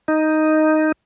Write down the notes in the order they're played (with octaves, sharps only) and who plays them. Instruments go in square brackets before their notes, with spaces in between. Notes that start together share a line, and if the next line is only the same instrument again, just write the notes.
[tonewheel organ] D#4